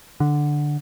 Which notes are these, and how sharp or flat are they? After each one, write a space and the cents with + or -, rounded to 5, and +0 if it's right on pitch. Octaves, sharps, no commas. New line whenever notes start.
D3 +5